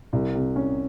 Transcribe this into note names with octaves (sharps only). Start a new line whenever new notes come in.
C2
C3
C#4